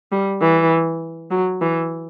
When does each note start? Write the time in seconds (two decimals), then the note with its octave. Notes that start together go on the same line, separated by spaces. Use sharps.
0.12 G3
0.41 E3
1.31 F#3
1.61 E3